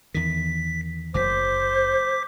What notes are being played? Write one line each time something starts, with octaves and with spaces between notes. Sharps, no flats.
E2 D#3 B6
F#1 F#3 C5 D6 B6